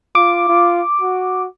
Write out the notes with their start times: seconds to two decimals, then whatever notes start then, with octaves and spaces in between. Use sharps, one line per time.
0.15 F4 D6
0.48 F4
1.01 F#4